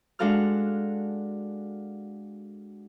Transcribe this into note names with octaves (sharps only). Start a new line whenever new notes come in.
G#3 D4 F#4 A4 F5 F6